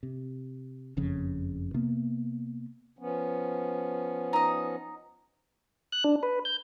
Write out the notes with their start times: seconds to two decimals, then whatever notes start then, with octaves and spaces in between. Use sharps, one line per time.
0.03 C3
0.97 F#1 F2 C#3
1.74 C3 A#3 B3
2.99 F3 B3 C#4
4.33 D#4 D#5
5.92 F#6
6.04 D4
6.23 B4
6.45 G6